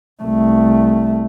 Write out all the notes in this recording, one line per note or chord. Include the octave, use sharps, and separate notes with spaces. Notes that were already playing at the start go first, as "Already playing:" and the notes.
C2 A3